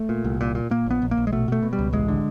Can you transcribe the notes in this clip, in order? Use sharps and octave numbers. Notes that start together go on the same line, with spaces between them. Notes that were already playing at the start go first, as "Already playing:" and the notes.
Already playing: A3
A#2
C2
A#2
A#2
A#2 A#3
A#1 B3
A#1
A#3
A#1
G#3
B2 A3
B2 A3
B2
G3
C#2
A1 G#3
D3